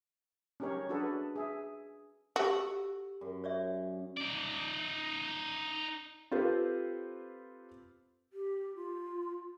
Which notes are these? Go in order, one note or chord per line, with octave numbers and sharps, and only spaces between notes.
C#4 D#4 G4 A#4 C#5
D4 F#4 G#4 A4 B4
G#4 E5
F#4 G4 A4 E6
F#2
C#5 D5 E5
D#4 D5
C4 F4 G4 A4 B4 C5
G4
F4